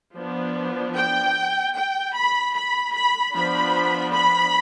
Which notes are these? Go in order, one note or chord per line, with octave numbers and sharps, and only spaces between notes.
F3 B3 D4
G5
G5
B5
B5
B5
F3 B3 D4 B5
B5